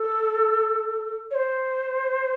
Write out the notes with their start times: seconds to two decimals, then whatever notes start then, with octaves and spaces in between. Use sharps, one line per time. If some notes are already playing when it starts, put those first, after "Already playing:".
Already playing: A4
1.30 C#5
1.34 C5